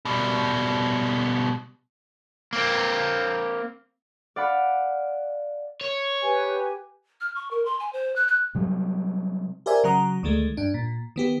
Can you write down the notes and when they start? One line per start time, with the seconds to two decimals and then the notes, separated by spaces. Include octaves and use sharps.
0.05 B2 G3
2.53 A#3 C4
4.36 D5 F5 F#5 B5
5.81 C#5
6.23 G4 B4 G#5
7.21 F6
7.35 C#6
7.51 A#4
7.65 C6
7.80 G#5
7.93 C5
8.16 F#6
8.28 F#6
8.55 C3 F#3 G3
9.66 G4 A#4 C5 D5 E5 G#5
9.84 C#3 F#3 F#5 A#5 D#6
10.23 D2 D#3 G#3 A3
10.57 G2 D4
10.74 A#2
11.16 D#3 B3 G4